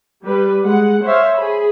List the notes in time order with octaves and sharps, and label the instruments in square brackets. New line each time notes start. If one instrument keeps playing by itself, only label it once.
[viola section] G3 B4
G#3 F#5
C5 C#5 E5 F5
G#4 B5